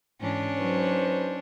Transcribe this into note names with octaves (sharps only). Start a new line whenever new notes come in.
G#2 E3 C#4 D4
F#3 D#4 B4 C5